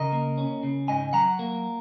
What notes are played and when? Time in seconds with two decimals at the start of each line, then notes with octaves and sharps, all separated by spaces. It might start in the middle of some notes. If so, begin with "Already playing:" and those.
Already playing: C#3 A#4 D#5
0.12 A#3
0.38 C#4
0.63 C#3
0.88 G#2 D#5 G#5
1.13 F#3 F#5 A#5
1.39 A#3